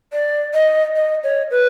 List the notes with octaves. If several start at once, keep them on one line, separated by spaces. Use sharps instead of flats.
D5
D#5
D#5
C#5
B4